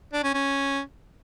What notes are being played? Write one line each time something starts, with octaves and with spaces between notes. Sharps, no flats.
D4
C#4
C#4